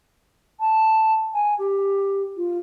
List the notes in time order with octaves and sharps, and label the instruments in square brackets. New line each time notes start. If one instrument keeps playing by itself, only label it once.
[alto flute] A5
G#5
G4
F4